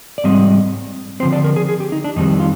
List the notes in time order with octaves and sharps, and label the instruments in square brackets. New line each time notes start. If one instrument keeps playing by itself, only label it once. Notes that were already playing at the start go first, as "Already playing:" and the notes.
[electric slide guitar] D5
G#2 G3 C4 D#5
D3 F3 C4 C5
D5
A#4
G#4
G#4
G4
D#4
D4
F2 D#3 G3 C4 D#4
F4